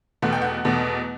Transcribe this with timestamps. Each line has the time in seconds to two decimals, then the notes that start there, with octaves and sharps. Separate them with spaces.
0.22 E2 B2 A3 F#5
0.32 G5
0.42 F#5
0.64 E2 B2 A3